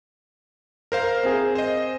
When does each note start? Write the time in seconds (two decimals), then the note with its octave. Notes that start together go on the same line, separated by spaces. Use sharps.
0.92 A#4 C5 F5
1.23 C4 G#4
1.55 C5 D#5